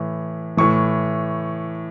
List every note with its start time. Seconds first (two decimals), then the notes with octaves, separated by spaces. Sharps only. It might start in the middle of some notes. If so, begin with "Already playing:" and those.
Already playing: A2 E3
0.57 A2 E3 C#6